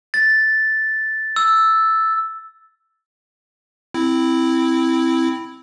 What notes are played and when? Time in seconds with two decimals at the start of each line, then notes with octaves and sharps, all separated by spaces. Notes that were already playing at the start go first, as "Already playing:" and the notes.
0.14 A6
1.36 E6
3.94 C4 E4